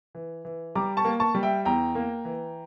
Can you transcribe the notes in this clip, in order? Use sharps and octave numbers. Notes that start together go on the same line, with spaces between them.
E3
E3
G3 A#5 D6
A5 C#6
A#3
A5 C#6
G3
E5 G5
E2 G5 A#5
A#3
E3